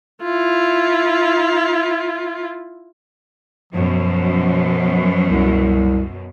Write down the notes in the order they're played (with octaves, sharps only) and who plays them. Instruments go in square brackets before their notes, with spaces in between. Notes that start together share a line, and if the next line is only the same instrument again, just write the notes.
[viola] E4 F4
[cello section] F#2 B2 [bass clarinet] F3
[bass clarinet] C2